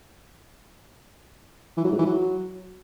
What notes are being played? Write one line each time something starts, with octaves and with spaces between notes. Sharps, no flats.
E3
F#3
G#2
E3
F#3